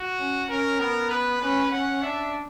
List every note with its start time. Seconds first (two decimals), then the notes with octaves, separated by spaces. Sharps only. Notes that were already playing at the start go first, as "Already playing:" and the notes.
Already playing: F#4
0.19 C#4
0.50 C#4 A#4
0.80 B3 A#4
1.10 B4
1.41 C#4 B4
1.71 C#4 F#5
2.02 D4 E5